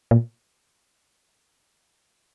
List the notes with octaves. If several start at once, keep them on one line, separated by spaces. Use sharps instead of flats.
A#2